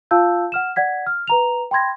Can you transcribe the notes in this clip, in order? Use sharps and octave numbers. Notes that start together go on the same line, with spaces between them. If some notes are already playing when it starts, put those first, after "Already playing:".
F4 F5 A5 E6 G6
F#5 F6 E7
D5 F#5 G#6 B6
F6
B4 A#5 F7
G5 B5 C6 G#6 A#6